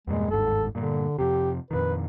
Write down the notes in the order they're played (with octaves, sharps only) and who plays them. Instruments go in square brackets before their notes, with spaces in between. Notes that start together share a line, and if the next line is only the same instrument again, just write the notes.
[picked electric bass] E2 G2 A#2 [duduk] G#3
[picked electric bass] G1 D#2 G#2 [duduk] A4
[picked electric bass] G2 A#2 [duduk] D3
[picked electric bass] F2 C3 [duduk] G4
[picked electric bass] F2 A#2 D#3 [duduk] B4